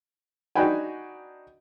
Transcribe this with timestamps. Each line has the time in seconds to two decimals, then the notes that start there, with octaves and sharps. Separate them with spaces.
0.55 D4 D#4 F#4 B4 G5 G#5